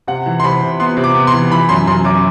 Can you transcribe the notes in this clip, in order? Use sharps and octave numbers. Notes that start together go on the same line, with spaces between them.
C3 F#5
E3
C6
C3 B5
C3
B3 C6
C3
D6
B3
C6
E3
E3 B5
F#2 C6
F#2 C6
F#2 D6